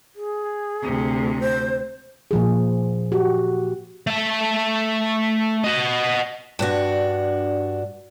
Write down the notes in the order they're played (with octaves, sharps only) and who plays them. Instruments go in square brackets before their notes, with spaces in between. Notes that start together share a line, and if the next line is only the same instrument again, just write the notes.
[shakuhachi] G#4
[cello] D2 C3
[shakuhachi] C5
[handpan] A#2 F3 G#4
F#4 G4
[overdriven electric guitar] A3 A5
F#4 D#5
[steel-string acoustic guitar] G2 D4 F#4